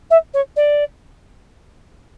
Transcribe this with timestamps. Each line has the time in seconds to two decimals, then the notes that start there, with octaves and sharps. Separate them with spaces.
0.10 E5
0.33 C#5
0.56 D5